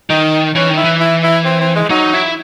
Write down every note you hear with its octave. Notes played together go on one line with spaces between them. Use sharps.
D#3 D#4
E3 C#4
D#3
E4
E3
E4
E4
C4
C4
G#3
F#3 D#4
E4